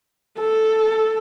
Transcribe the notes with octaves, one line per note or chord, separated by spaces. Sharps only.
A4